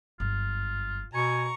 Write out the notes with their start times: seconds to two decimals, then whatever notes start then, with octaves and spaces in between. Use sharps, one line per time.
0.20 G1 F#2 F4
1.14 B2 G#5 A#5 C#6